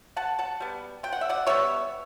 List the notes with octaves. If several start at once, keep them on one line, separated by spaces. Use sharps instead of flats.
B2 F#5 A5
F#5 A5
G3 B3
B2 G5
F#5
E5
D5 F#5
G3 B3 C#5 E5